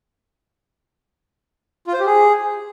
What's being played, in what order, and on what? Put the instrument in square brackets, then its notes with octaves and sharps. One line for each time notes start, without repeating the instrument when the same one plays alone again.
[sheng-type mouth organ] F4
C5
G4
G#4